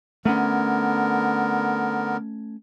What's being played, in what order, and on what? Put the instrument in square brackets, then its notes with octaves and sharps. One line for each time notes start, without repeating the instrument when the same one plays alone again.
[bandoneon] D3 B3 A#4 [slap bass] A3 C#4